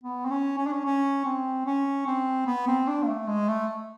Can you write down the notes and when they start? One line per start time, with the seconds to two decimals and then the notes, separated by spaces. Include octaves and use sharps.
0.04 B3
0.25 C4
0.30 C#4
0.57 C#4
0.66 D4
0.73 C#4
0.85 C#4
1.25 C4
1.66 C#4
2.06 C4
2.46 B3
2.67 C4
2.88 D4
3.03 A#3
3.08 A3
3.27 G#3
3.48 A3